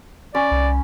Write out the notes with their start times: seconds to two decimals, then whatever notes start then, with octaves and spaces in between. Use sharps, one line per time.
0.35 C#4 D5 B5
0.51 C2